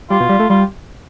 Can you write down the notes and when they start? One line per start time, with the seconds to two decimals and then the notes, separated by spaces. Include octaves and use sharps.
0.10 G3 F4
0.20 B2
0.29 G3
0.39 A3
0.50 G3 F4